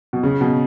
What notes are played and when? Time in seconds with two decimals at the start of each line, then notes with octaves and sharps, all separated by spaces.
0.13 B2
0.23 C#3
0.41 B2